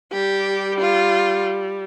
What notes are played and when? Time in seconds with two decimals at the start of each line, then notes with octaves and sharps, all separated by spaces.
0.12 G3 G4
0.80 F4